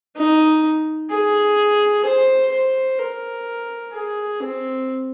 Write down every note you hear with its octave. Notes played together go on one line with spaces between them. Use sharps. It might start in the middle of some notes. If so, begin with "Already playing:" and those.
D#4
G#4
C5
C5
A#4
G#4
C4